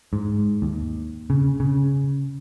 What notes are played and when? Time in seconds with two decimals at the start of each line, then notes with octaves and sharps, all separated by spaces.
0.13 G#2
0.62 D#2
1.30 C#3
1.60 C#3